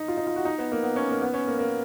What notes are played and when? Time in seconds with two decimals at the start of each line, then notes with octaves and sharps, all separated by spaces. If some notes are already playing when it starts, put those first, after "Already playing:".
Already playing: D#4
0.08 F4
0.17 D#4
0.27 F4
0.36 F#4
0.45 D#4
0.58 B3
0.72 A#3
0.83 B3
0.96 C#4
1.09 A#3
1.22 B3
1.34 C#4
1.47 A#3
1.59 A#3